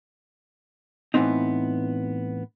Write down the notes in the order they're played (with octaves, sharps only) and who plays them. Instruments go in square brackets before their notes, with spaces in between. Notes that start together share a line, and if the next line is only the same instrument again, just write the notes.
[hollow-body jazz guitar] A2 E3 G3 B3 C4 D#4